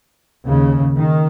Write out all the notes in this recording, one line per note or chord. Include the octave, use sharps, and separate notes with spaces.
D#2 C#3
D#3